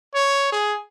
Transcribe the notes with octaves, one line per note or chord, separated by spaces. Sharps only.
C#5
G#4